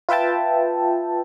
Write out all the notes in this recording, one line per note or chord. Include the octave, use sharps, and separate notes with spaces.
F4 B4 E5 G5 A5